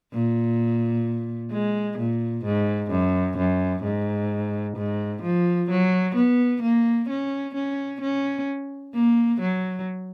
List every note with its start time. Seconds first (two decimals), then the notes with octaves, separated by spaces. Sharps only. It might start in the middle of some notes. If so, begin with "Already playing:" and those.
0.13 A#2
1.51 G#3
1.98 A#2
2.45 G#2
2.91 F#2
3.38 F#2
3.83 G#2
4.77 G#2
5.23 F3
5.70 F#3
6.15 B3
6.62 A#3
7.09 C#4
7.54 C#4
8.01 C#4
8.94 A#3
9.40 F#3